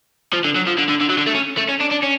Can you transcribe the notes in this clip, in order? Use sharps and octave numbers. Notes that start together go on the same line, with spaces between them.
F3
D3
F#3
F3
D3
D3
D3
F#3
D3
A3
C#4
A3
C#4
D4
D4
C#4